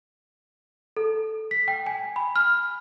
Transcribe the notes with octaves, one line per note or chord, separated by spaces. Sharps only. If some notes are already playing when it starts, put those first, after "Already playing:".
A4
B6
G5
G#5
B5
F6